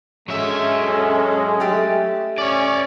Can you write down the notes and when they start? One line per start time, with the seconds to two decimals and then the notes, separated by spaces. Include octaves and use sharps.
0.28 F#3 G#3 C#4 A4 E5
1.60 A3 G4
2.38 C#4 C#5 D5